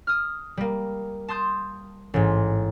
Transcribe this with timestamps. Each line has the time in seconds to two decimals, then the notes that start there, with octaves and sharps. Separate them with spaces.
0.07 D#6 F6
0.57 G3 A#3
1.28 A5 C6 D#6 G6
2.14 A1 G#2